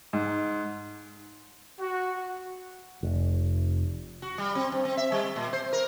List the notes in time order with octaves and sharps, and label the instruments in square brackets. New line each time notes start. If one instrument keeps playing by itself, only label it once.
[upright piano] G#2
[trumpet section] F#4
[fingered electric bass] F1
[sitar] F#4
G3
C4
G2
C4
E5
G3
A#2
C5
A#4